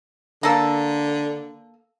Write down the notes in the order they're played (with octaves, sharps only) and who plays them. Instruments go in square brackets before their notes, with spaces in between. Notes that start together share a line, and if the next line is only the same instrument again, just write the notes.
[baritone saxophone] D3 [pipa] A#3 A4